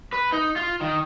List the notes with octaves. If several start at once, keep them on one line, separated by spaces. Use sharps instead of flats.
B4
D#4
F4
D#3